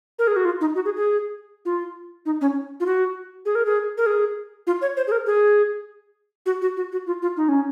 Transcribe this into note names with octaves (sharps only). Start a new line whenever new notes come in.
A#4
G#4
F#4
F4
D#4
F#4
G#4
G#4
F4
D#4
C#4
F4
F#4
G#4
A#4
G#4
A#4
G#4
F4
C#5
C5
G#4
A#4
G#4
F#4
F#4
F#4
F#4
F4
F4
D#4
C#4